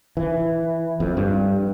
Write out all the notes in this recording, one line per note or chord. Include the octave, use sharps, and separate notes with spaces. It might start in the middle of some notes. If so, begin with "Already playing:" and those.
E3
F2
G2